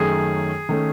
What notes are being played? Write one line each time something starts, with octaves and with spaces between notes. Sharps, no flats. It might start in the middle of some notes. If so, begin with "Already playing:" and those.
Already playing: F#2 D#3 A3 C#4 G#4
D#3 A3 C#4